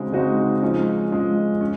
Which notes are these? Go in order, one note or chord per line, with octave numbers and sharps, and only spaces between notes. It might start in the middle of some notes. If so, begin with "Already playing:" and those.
Already playing: C#3 G#3 C4 D#4 F#4
C#3 G#3 C4 D#4 F#4
F3 G#3 C#4
F3 G#3 C#4
C#4